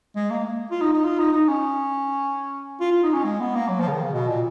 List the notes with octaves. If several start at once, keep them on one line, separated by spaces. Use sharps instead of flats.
G#3
A#3
F4
D#4
D#4
F4
D#4
D#4
C#4
F4
F4
D#4
C#4
G#3
B3
A#3
F#3
F3
C#3
D#3
C#3
B2
A#2